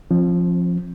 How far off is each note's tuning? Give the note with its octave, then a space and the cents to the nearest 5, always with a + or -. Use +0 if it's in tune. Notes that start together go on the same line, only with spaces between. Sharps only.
F3 +0 C4 +35